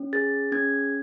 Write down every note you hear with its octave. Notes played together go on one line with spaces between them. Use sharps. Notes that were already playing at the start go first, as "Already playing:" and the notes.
Already playing: C#4
G#4 A6
C#4 G#6